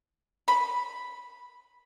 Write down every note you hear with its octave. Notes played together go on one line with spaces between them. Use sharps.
B5